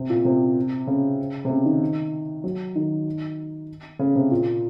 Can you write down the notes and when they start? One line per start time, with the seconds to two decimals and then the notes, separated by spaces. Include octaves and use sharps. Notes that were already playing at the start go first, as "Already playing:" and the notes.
Already playing: C3
0.10 A#2
0.25 C3
0.87 C#3
1.45 C3
1.50 C#3
1.65 D#3
2.44 F#3
2.75 D#3
3.99 C#3
4.16 C3
4.31 A#2